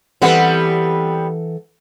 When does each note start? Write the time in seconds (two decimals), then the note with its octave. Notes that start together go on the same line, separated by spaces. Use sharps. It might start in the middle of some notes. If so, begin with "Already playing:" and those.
0.22 E3 G3 B3 C4 A4 F#5